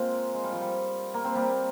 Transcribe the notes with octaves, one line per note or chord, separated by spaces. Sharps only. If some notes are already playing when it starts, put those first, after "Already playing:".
Already playing: G#3 A#3 C4 F4
G#3
G3
F3
G3
A#3
C4
G3 A#3